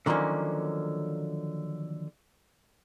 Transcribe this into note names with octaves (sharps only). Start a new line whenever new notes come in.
D3 D#3 F3 F#3 A#3 C#4